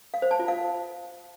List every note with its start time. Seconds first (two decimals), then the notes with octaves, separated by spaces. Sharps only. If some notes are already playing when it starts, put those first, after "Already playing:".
0.14 F5
0.22 C5
0.31 A5
0.40 F4
0.48 F5